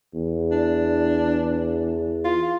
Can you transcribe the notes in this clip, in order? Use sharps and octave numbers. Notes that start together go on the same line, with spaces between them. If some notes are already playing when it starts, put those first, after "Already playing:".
E2
D4
F4